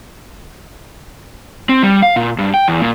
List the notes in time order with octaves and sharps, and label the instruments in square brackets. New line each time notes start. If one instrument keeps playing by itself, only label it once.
[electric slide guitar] C4
G3
F5
A#2
G2
G5
E2
A#2